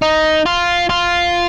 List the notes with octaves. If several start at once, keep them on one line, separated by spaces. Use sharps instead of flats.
D#4
F4
F4